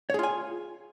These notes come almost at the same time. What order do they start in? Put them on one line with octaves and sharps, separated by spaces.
C#5 G#4 F4 G#5